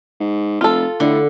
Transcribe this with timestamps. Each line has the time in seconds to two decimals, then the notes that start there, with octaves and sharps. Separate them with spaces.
0.20 G#2
0.61 F1 F4 A4
1.00 A2 D3